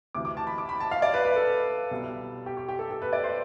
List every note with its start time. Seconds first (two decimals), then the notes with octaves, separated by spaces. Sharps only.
0.14 D2 C3 E3 D6
0.25 D6
0.37 A5
0.47 B5
0.58 D6
0.69 B5
0.80 A5
0.91 F5
1.02 D5
1.14 B4
1.25 B4
1.36 A4
1.91 C2 B2 G3
2.46 G4
2.57 G4
2.68 G4
2.79 A4
2.91 A4
3.02 B4
3.13 D5
3.24 C5